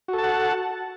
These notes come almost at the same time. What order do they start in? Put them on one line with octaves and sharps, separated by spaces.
F#4 A4 A5 F#5